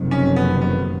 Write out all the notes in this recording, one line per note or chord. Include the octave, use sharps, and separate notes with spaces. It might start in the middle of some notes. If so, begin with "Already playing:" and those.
Already playing: F#1 F2 C3 D#3
C#4
B3
B3